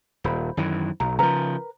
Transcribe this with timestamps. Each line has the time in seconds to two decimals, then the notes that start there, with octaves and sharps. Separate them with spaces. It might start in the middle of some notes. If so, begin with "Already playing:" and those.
0.24 D#1 C5 B5
0.57 F#2 D#3 E3
1.00 B1 A#5
1.19 C#3 F3 A#4 B4 A#5